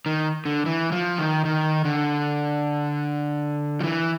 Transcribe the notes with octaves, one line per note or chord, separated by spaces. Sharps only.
D#3
D3
E3
F3
D#3
D#3
D3
F3
E3